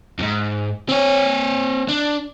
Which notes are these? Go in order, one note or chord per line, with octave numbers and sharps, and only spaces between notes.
F2 G#2
C4 C#5
D4